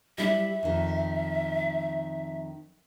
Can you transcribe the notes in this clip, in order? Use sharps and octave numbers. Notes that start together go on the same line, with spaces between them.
G3 E4 E5
F2 D#3